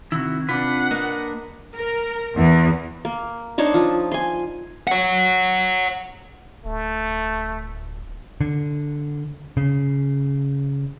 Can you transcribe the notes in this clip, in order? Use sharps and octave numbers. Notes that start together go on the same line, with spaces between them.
C3 D#3 E4 F#4
C3 D4 F4 B4 F#5
A#3 A#4 D#5
A#4
E2
A#3
D4 D#4 C5 C#5
F3
G#5 C6
C#5 F#5
D1 A3
D3
C#3